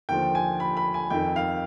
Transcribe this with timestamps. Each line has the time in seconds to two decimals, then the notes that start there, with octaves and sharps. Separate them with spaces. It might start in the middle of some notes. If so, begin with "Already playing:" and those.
0.09 D#2 D3 F3 G5
0.35 G#5
0.60 B5
0.77 B5
0.94 G#5
1.10 F2 D#3 G5
1.36 F5